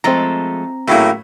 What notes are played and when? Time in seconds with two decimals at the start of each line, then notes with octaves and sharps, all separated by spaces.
0.04 F3 G#3 A3 C4 A#5
0.88 A2 C#3 F#3 A#3 E4